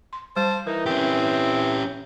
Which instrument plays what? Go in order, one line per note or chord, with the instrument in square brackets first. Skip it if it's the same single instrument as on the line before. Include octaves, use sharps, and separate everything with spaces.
[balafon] C6
[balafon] G3 [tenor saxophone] C5 [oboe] A5
[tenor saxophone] E3 [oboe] D#4 [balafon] A#4
[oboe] C4 [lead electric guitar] C#4 G4